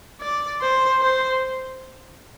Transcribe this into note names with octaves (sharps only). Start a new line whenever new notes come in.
D5
C5
C5